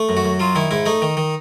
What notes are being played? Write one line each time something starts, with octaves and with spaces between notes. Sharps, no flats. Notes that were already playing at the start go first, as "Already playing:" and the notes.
Already playing: A3
F#2
F#4
F#2
F#3 F4
D#3 E4
G#2 E4
A3 D#4
D#3
D#3